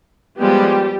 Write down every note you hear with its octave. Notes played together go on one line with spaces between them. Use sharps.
F3 G3 G#3 B3 G4